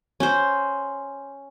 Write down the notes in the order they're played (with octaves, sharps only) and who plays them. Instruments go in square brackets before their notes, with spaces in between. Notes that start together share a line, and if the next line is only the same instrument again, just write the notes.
[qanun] C#4 C5